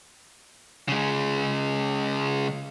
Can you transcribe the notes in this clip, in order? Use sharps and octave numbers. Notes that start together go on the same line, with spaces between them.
C#3 G#3